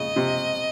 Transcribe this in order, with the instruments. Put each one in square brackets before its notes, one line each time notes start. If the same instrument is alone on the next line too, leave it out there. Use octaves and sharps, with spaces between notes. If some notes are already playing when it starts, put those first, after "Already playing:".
Already playing: [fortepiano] C#3 [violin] D#5
[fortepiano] C3